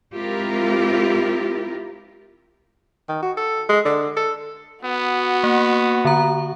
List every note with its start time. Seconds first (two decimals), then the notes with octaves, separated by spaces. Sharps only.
0.14 G#3 C4 E4 F4 G4 A#4
3.09 D#3
3.22 F#4
3.37 A4
3.69 G#3
3.85 D3
4.17 A4
4.84 B3 F#4
5.44 A#3
6.05 D3 A#5